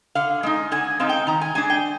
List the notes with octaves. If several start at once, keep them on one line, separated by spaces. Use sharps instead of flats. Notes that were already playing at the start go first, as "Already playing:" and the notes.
D3 F5
G#3 C4 D#4
D3 G#5
G#3 C4 D#4 F5
G5
D#3 A#5
G#5
G#3 D4 G#5
G5